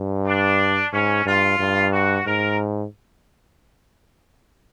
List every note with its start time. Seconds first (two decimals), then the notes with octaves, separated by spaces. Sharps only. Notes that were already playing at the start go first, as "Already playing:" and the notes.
Already playing: G2
0.27 D4
0.93 G#2 C#4
1.26 G2 F4
1.59 G2
1.92 F#4
2.26 G#2 A#4